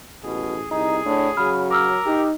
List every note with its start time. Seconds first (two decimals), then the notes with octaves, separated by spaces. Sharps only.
0.24 A1 B2 G#4
0.71 C2 D#4 G#4
1.05 A2 D4
1.37 C#3 F#3 B5 F6
1.71 A#4 D6 E6 F6
2.06 D#4 G4